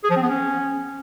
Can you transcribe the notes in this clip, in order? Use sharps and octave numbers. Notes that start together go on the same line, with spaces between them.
G#4
F3
C4
B3
C#4